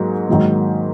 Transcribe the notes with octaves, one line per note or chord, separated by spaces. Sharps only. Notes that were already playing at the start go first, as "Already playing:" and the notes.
Already playing: G#2 F#3 A#3
G#2 D#3 F#3 A#3